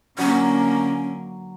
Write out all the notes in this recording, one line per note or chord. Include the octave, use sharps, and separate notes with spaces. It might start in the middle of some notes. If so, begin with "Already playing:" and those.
D3 F#3 A#3 C#4